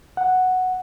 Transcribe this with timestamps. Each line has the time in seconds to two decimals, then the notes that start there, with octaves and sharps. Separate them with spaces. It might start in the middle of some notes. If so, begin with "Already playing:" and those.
0.17 F#5